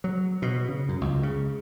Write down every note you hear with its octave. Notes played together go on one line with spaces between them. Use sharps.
F#3
B2
C#3
F#2
C#2
C#3